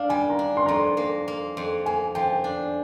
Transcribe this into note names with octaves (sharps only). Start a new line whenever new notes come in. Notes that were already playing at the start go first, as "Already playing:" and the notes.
Already playing: D4 F5
G3 G#5
A#5
D4
C6
F2 A#5
C6
A#3
A#3
F2
A#3 G#5
F3 G5
D4